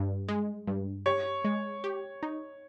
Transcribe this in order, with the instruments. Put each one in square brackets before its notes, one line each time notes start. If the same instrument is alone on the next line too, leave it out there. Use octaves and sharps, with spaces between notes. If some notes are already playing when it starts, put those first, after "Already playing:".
Already playing: [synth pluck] G2
G#3
G2
[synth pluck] G4 [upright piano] C#5
[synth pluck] G#3
G4
D#4